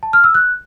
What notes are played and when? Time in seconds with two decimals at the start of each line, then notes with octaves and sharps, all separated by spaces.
0.03 A5
0.13 F6
0.24 E6
0.35 F#6